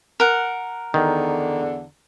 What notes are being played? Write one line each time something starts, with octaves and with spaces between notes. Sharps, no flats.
A#4 F#5
E2 D3 D#3